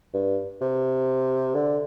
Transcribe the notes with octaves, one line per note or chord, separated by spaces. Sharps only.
G2
C3
D3